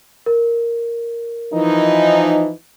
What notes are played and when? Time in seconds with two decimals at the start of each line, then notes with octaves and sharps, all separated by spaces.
0.26 A#4
1.54 E3 F3 D#4